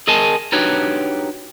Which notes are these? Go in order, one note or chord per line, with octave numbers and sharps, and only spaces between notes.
G#4 A#4 D#5 G#5 A5
D4 D#4 F#4 G4 B4 C#5